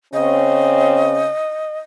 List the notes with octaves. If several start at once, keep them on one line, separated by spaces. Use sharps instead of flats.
C#3 C4 C#4 D#5